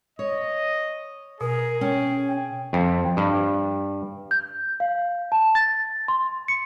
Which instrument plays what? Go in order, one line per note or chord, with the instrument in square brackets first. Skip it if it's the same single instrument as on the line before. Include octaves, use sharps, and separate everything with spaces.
[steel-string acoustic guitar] C#5 [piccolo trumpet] D#5
[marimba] B2 [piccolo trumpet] G#4 [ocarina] A#4
[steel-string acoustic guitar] C#4 [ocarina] G5
[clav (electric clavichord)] F2
G2
[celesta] G6
F5
A5
A6
C6
C#7